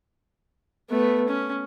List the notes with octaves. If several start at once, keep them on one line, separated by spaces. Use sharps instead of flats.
A3 B3
C#4